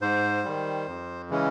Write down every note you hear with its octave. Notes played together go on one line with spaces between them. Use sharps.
G#2 C5
D#3 G3
F2
C#3 E3 G#3 C#4